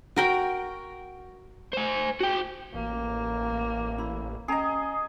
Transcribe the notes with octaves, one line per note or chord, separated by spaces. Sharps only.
F#4 A#4 G5
C5 G#5
F#4 G5
A1 A#3
E4 B5
C#4 G#4 D#5 G5 A#5